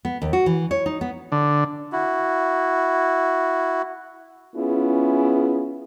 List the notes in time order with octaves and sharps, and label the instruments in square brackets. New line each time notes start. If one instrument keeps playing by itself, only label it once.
[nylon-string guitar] B3
D#2
F#4
E3
C#5
D#4
B3
[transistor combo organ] D3
[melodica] E4 F#4
[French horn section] B3 C#4 E4 F4 G#4